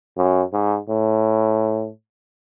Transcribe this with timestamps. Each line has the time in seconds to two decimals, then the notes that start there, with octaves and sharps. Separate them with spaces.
0.17 F#2
0.53 G#2
0.89 A2